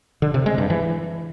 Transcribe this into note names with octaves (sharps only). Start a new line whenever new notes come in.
D3
C3
G#3
G2
E3